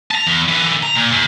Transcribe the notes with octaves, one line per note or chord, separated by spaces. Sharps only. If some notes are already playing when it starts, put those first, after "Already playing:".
A5 A#5
E2
D3 E3
A#5
A#2
D#2